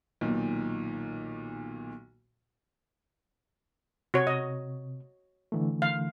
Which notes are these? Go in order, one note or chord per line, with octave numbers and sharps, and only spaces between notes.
B1 A#2 D#3
C3 F#4 C#5
D#5
D3 E3 A3
F5